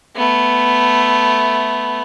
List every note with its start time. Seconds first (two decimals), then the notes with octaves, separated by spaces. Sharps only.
0.16 A3 B3